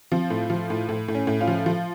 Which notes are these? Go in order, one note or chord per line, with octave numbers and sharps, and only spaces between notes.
F3 C4
A2
F3
A2
A2
A2
C#4
A2
C#4 F4
F3
F3